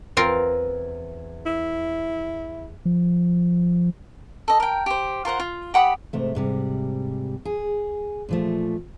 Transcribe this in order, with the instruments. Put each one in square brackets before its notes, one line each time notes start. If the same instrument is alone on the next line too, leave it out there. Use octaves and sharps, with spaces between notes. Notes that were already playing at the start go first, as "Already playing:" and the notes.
[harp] E2 [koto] C4 F4 A#4
[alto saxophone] E4
[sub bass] F3
[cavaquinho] A4 D#5
A#4 G5
G4 C5
F4 A#4 C5 F#5
F4
G4 F#5 B5 D#6
[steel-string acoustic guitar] G#2 C3 A3
G#2 C3 G3
G#4
A#2 F3 A3